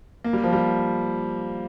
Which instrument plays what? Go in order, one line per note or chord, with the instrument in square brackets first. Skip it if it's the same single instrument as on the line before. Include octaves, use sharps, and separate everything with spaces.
[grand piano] A#3
G3
F3
G3